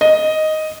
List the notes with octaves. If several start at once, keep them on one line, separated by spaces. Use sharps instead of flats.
D#5